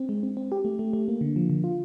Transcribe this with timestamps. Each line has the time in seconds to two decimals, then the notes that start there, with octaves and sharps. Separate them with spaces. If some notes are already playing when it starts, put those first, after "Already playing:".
Already playing: C4
0.09 G#3
0.23 C4
0.37 C4
0.52 G4
0.65 A3
0.79 A3
0.93 A3
1.08 A#3
1.21 D3
1.36 F3
1.50 D3
1.64 F4